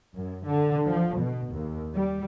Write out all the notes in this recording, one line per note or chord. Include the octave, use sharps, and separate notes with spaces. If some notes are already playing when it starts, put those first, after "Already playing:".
F#2
D3
F3
B2
D#2
G3